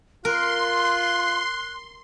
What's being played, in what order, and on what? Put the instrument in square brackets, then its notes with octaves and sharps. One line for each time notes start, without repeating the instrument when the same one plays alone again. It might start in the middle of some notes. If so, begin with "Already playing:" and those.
[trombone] F4 [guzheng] A#4 [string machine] C6 [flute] F#6